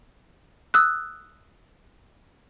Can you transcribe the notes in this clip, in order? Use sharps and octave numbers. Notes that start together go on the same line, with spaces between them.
D#6 E6 F#6